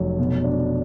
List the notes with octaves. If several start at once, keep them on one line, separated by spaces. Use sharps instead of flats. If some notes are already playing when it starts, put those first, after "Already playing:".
Already playing: F1 F#3
B2
D4